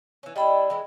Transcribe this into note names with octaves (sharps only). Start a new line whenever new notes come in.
E3 C#4
G3 D4 E4 D#5 G5 B5
E3 G#3 E4